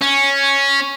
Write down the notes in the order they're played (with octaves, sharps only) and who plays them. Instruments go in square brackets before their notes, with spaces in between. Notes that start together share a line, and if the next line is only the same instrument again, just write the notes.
[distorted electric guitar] C#4